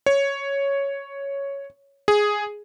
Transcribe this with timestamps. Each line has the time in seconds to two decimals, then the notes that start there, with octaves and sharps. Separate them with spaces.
0.06 C#5
2.08 G#4